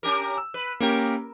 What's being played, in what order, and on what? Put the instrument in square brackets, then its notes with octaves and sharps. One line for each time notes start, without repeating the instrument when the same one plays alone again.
[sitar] C#4 G4 A#4
[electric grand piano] E6
[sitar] B4
[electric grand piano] A#3 C#4 G4 [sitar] A#4